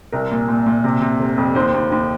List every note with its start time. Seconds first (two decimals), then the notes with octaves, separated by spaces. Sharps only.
0.12 C2 A#4
0.31 A#2
0.48 A#2
0.66 A#2
0.84 C3
1.01 C3
1.20 F1
1.38 F2
1.55 D#2 C5
1.74 D#2
1.92 D#2